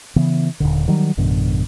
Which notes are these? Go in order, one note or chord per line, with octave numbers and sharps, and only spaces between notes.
C#3 E3 B3
D#1 E2 D3
D#3 F#3 G3
A1 F#2 B2 D3